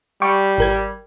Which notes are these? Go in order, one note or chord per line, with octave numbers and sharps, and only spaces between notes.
G3 G5 C#6 D6
G#1 A#4 G#6